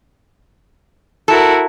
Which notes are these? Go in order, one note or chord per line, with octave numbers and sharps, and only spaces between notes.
E4 F#4 A4 A#4